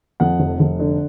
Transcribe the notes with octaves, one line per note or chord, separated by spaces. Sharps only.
F2 F#5
F1
F1
D3